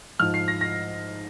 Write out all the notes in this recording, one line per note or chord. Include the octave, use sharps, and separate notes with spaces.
G#2 F3 F6
C7
A#6
A#6